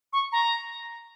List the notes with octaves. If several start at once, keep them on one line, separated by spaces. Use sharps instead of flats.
C#6
A#5